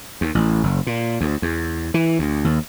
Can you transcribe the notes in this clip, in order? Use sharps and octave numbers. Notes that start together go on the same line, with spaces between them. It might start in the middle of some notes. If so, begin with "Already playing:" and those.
D#2
A1
F#1
A#2
D2
E2
E3
D2
D#2